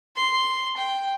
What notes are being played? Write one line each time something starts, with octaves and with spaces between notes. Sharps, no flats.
C6
G5